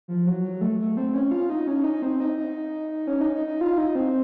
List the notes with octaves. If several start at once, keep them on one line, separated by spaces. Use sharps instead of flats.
F3
F#3
F#3
A3
A3
C4
C#4
F4
D#4
C#4
D#4
C4
D#4
D#4
C#4
D#4
D#4
D#4
F4
D#4
C4